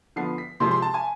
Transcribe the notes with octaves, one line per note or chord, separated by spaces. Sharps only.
D3 F3 B3 C7
B6
C3 F3 G#3 C4 C6
C6
A5
G#5